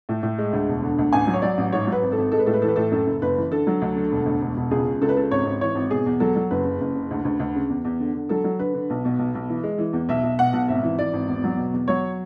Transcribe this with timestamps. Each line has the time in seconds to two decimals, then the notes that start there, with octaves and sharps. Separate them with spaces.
0.09 A2
0.23 A2
0.38 G#3
0.53 D2
0.69 E1
0.83 D3
0.98 D2
1.13 A1 G#5
1.27 F#3
1.34 C#5
1.42 F#3 D5
1.58 A1
1.72 G#2 C#5
1.87 F#3 B4
2.03 G#1
2.12 A4
2.18 G#1
2.32 G#3 A4
2.39 B4
2.46 A2 A4
2.54 B4
2.62 E3 A4
2.68 B4
2.76 A2 A4
2.91 F#2 A4
3.06 F#1
3.22 F#1 B4
3.37 E3
3.51 D3 A4
3.67 F#3
3.82 D2
3.96 D3
4.12 E1
4.26 D2
4.41 E1
4.57 E1
4.71 C#2 G#4
4.86 C#3
5.02 C#2 A4
5.09 B4
5.16 C#3 A4
5.31 G#1 C#5
5.45 G#1
5.61 E3 C#5
5.75 G#1
5.90 B2 G#4
6.06 E2
6.20 F#3 A4
6.36 F#3
6.51 F#1 B4
6.65 C#3
6.81 F#1
6.95 C#3
7.11 D2
7.25 D2
7.40 D2
7.55 C#3
7.70 E2
7.85 E2
8.00 D3
8.15 D3
8.29 F#3 A4
8.44 F#3
8.59 D3 B4
8.74 D3
8.90 B1
9.05 B2
9.19 B1
9.35 B1
9.48 E3
9.63 G#3
9.78 E3
9.93 E2
10.09 B1 E5
10.23 B1
10.39 B2 F#5
10.53 B1
10.68 G#1 E5
10.83 E3
10.98 E3 D5
11.13 G#1
11.28 E2
11.44 F#3
11.57 B2
11.74 E2
11.88 F#3 C#5